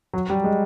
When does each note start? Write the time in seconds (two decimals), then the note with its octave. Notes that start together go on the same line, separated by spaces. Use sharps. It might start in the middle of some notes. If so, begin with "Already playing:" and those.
0.14 F#3
0.30 G3
0.44 G#3